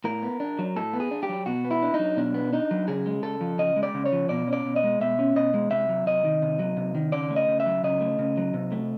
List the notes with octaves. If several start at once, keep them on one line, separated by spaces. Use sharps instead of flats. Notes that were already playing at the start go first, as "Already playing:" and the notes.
A2 A#4
B3
D4
F#3
A2 A4
B3
G#4
D4
G4
F#3
B2 F#4
B3
E4
D4
D#4
F#3
B2 D4
B3
D4 D#4
F#3
C#3 G#4
G#3
C#3 A4
F3
C#3 D#5
G#3
D5
C#3
C#5
F3
B2 D5
C#4
D5
B2
D#5
G#3
B2 E5
C#4
B2 D#5
G#3
C3 E5
F#3
C3 D#5
D#3
C3
F#3
C3
D#3
C#3 D5
A3
D#5
C#3
E5
F#3
C#3 D#5
A3
C#3
F#3
C3
A3